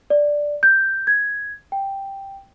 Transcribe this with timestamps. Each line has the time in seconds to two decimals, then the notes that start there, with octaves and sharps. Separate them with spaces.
0.10 D5
0.63 G6
1.07 G#6
1.72 G5